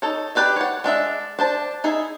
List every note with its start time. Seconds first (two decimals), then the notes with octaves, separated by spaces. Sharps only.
0.02 D#4 A4 C#5
0.35 D4 G4 B4 D5 E5
0.56 C#5 F#5
0.84 G#3 D4 E5
1.39 D4 C5 A5
1.84 D#4 E4 G#4